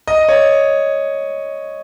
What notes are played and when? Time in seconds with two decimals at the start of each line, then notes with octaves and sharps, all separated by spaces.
0.08 D#5
0.29 C#5